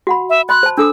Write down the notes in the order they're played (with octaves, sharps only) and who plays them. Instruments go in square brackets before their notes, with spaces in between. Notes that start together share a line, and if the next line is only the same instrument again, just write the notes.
[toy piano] F#4 F#5 B5
[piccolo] E5
[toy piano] D#5 B5 C6 [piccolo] F#6
[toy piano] C5 A5
[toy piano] D4 A4 D#6 [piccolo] E6